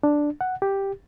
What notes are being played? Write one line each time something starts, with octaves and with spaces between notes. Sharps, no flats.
D4
F#5
G4